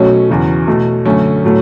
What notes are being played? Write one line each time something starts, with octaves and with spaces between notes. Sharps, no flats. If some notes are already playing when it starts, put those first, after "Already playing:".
Already playing: B2 F#3 A3 C#4
E2 C#3 F#3
B2 A3
F#2 D3 A3 C#4
A2 F#3 A3